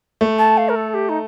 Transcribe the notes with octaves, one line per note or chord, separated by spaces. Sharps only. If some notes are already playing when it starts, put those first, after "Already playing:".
A3
A5
F5
A#4
A4
G4
D#4